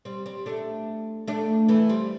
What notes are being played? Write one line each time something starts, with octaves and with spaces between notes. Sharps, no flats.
G3 C4
G3 C4
A3 D4
A3 D4
E3 A3
G3 C4